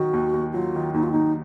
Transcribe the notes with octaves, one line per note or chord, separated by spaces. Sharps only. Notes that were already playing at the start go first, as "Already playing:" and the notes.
Already playing: D#3 F#3 F#4
D#2
D#2
F#3 F4
D#3
D#2 D#4
F4
D#2 D#4